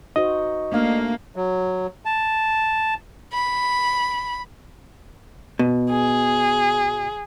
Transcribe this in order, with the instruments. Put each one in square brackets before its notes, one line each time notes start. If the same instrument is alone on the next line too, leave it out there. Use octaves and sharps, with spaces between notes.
[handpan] D#4 F#4 C5 [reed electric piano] D#5
[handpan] A3 D4 F5 [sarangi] A#3
[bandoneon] F#3
A5
[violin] B5
[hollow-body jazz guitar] B2
[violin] G#4